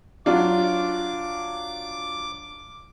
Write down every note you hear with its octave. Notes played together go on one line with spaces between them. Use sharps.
F#3 D4 F4 D6